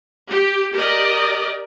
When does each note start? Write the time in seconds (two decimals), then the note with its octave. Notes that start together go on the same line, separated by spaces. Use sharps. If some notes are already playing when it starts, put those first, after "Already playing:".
0.30 G4
0.75 G4 A#4 D5 D#5